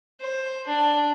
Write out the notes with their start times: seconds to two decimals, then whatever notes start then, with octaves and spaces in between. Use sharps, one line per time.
0.21 C5
0.67 D4